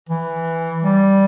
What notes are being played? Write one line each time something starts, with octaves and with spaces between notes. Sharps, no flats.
E3
G3